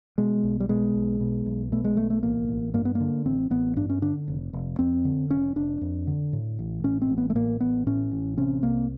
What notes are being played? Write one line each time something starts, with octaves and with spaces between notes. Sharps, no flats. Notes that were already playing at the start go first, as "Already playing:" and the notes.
B2 G#3
B1
G3
B2 G#3
B1
B2
B1
B2 A3
G#3
B1 A3
A3
A1 A#3
A1
G2 A#3
B3
A#3
D3
A1 C4
A1 B3
G2 D4
C#4
D3 D4
F1
F1
F2 C4
D3
F1 C#4
F1 D4
F2
D3
A2
A1
A2 C#4
C4
A1
B3
A3
A2 A#3
A1 B3
A2 C#4
A1
C3 C#4
C2 A#3